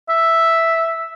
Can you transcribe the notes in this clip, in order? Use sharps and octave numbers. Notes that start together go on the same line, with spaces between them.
E5